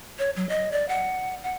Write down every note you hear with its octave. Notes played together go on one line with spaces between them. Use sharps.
C#5
F#3
D#5
D5
F#5
F#5